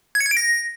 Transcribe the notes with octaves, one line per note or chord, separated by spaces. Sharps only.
G#6
C#7
G#6
D7
A#6